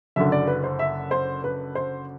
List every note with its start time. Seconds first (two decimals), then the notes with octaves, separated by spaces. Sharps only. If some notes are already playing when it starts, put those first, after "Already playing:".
0.16 F#1 F#2 D3 E5
0.32 D5
0.47 B4
0.64 C5
0.79 E5
1.11 C5
1.44 B4
1.75 C5